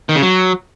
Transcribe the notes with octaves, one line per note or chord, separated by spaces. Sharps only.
D#3
C#3
F#3